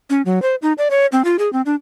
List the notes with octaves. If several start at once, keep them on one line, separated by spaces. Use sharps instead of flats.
C#4
F#3
C5
D#4
D5
C#5
C4
F4
G#4
C4
D4